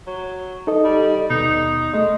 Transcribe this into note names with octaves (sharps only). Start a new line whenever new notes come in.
F#3
D#4 A4 D#5
G3
D#2 B2 D#4
G#3 A3 D#5